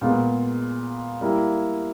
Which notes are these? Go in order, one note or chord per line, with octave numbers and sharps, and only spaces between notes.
A#2 G#3 B3
G3 A#3 E4